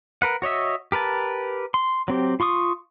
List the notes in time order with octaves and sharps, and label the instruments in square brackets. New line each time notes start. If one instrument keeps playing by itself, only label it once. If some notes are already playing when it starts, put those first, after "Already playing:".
[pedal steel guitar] A#4 B4 F#5
F#4 C#5 D#5 E5
G4 A#4 B4 A5
C6
F#3 C4 G4
F4 C6 C#6 D#6